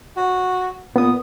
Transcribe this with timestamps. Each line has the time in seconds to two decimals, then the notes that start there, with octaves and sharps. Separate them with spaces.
0.17 F#4
0.96 A#2 B3 D#6